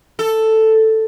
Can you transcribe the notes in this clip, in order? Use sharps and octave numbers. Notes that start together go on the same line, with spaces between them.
A4